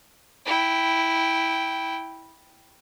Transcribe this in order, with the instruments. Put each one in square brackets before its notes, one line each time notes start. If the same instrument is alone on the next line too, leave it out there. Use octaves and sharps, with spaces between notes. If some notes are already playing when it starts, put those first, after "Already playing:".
[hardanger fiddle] E4 G5